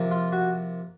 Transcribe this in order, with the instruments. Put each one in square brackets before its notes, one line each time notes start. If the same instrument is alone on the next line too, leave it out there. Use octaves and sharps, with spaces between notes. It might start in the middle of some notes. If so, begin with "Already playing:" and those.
Already playing: [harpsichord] C3 F3 A#3
F4
F#4